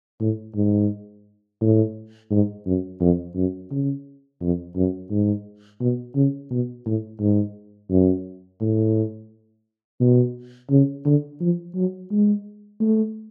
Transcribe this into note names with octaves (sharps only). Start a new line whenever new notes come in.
A2
G#2
A2
G#2
F#2
F2
F#2
C#3
F2
F#2
G#2
B2
C#3
B2
A2
G#2
F#2
A2
B2
C#3
D3
F3
F#3
G#3
A3